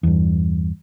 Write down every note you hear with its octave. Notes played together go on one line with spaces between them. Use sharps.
E2 G2